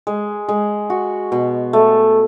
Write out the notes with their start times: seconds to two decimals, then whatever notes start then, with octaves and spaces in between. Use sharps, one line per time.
0.07 G#3
0.48 G#3
0.90 F#4
1.32 B2
1.73 A3